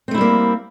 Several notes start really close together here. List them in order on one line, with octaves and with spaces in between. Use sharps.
C4 A3 E4 G3 A#3